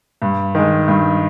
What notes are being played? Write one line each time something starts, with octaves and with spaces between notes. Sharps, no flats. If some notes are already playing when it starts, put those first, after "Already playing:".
G2
D#3 G#3
G2